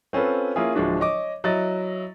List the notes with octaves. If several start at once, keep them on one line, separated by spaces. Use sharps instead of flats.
C4 C#4 F4 A4 B4
A#3 C#4 E4 F4 G#4
D1 F3 G#3 D4 F#4 E5
C#5 D#5 D6
F#3 E4 D#5 A6